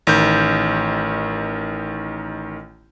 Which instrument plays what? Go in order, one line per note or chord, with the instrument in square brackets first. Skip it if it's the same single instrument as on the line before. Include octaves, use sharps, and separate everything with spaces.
[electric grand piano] A1 D#3 G6